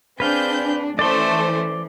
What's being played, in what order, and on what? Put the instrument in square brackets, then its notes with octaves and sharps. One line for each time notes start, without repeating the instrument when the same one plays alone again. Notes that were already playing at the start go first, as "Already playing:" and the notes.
[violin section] C4 G#4 G6 [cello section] D4 [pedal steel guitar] B4 F5
[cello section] E3 [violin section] A3 C#4 C5 [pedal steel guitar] D5 C6